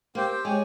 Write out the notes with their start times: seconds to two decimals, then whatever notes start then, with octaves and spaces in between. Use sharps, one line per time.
0.15 A#3 C4 G4 C5 G5
0.44 G#3 G4 C#5 G#5